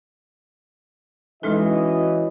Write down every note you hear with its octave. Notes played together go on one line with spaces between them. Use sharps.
E3 G#3 C#4 D#4 F#4 A4 D#5